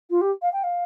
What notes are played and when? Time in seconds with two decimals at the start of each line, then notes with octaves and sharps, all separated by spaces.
0.10 F4
0.21 G4
0.42 F5
0.53 G5
0.63 F5